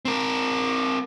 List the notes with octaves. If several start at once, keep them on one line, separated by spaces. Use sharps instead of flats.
C4 A#4